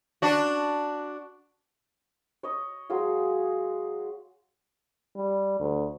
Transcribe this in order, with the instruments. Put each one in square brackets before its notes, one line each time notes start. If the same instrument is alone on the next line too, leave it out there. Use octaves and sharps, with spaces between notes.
[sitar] D4 F#4
[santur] C#5 D#5
F#3 G#3 G#4 F5
[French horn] G3
D2